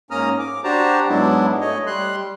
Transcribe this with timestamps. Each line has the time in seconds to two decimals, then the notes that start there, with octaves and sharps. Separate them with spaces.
0.11 G#2 A#3 C#4 A#5 D#6 F6
0.39 D6
0.64 D4 F#4 G4 C5 A5 A#5
1.09 G#2 F#3 G#3 B3 D4 E4
1.61 A3 C#5 D#5
1.87 G3 C6 F#6